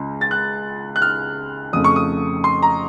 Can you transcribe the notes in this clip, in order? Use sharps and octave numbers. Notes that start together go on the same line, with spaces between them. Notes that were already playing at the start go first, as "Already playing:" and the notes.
Already playing: C#2 C#3
A6
F#6
F#6
F6
F2 C#3 A3 D#6
C#6
D#6
C6
A#5